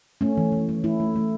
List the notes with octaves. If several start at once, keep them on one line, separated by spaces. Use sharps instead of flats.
A3 C#4
E3
E3
A3
A3 E4
A3
A3